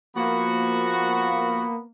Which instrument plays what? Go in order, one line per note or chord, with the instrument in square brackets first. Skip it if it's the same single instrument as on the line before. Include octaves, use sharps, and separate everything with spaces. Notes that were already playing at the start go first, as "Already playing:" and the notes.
[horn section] F3 F#4 [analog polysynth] A#3 [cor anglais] B3